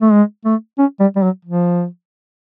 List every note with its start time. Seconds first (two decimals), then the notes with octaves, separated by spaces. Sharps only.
0.02 A3
0.12 G#3
0.45 A3
0.78 C#4
1.00 G3
1.16 G3
1.23 F#3
1.45 F3